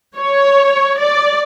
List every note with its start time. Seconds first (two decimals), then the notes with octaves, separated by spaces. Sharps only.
0.16 C#5
0.99 D5